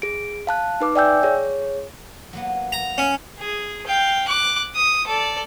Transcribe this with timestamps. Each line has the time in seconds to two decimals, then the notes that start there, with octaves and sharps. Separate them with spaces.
0.02 G#4 D7
0.47 F5 A5 F#6
0.80 D#4 B4 D6
0.95 D5 E5 G5 G#5 E6 G6
1.23 G#4 C#5
2.33 F#3 A#3 B3
2.72 A#5
2.98 C#4
3.39 G#4
3.87 F5 G5
4.28 D6 F#6
4.75 D#6
5.07 A4 D5